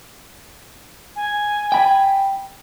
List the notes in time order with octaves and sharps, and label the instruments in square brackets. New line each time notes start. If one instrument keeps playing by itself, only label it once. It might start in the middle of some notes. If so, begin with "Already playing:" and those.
[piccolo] G#5
[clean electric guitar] G5 B5